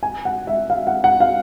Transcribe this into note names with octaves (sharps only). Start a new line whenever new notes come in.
G#5
F#5
E5
F5
F#5
F#5
F5